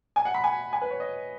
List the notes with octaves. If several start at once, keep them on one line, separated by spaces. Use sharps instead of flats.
G#5
F#5
B5
G#5
G#5
B4
C#5
D#5